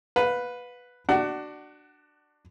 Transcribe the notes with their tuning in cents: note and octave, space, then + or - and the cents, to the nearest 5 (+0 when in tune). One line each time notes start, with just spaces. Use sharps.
B4 +0 F5 +40
D4 +15 F#4 +20 F#5 +30